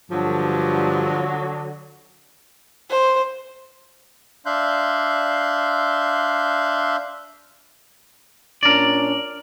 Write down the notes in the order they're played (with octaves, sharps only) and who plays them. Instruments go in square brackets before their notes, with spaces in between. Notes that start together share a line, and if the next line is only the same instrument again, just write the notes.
[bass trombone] G2 [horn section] D3 F#3 [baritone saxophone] F3
[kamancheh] C5
[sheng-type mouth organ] D4 E5 F5 C6 F#6 G6
[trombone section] A#2 C#4 D4 [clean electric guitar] A#4 D5